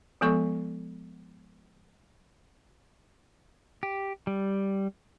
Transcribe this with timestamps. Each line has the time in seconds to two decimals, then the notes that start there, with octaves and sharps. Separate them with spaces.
0.21 F3 G#3 B3 A4 C#6
3.83 G4
4.27 G3